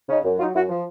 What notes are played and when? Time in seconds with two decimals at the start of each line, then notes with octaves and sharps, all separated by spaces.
0.09 C#3 C#4 D#4
0.24 F#2
0.39 F#3 D#4 F4
0.54 F#2 E4 F#4
0.69 F3